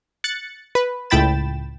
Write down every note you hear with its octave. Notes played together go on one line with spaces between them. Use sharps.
F#6 A6 C#7
B4
C#2 A2 G5 B5 A6 E7